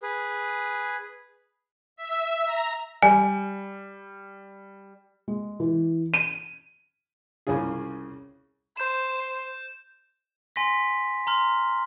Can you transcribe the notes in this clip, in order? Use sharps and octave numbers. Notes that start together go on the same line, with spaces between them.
G#4 B4
E5
A#5
G3 G#5
G#3
E3
D#7
C2 C#3 C#4 F4 G#4
C5 G6 E7
G#5 C6 A#6 B6
A#5 C6 F6 F#7